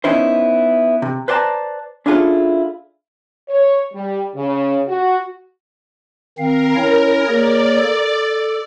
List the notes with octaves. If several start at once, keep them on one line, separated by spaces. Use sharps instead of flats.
B3 C#4 D#4 E4 C5
C3
B4 C5 D5 F#5 A5 A#5
C#4 D4 E4 F4 G#4 A4
C#5
G3
C#3
F#4
D#3 C4 A#4 F5
C#4 E4 C#5
A#3 G#4 C#5 D5
A4